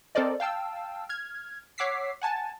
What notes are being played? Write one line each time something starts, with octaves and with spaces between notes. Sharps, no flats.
C4 A4 A#4 C5 D5 D#5
F5 G5 A5 E6
F6 G#6
C#5 F#5 D6 E6 B6 C7
F#5 G#5 A5 A6